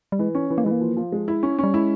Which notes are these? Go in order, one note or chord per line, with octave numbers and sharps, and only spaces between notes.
G3
E3 G#3
C#4
E3
A#3
E3 G#3
A#3
F3
F3
G#3
E4
C#4
G3 C#4
G#3 E4